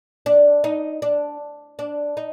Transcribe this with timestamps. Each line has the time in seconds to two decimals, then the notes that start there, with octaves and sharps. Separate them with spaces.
0.26 D4
0.64 D#4
1.02 D4
1.79 D4
2.17 D#4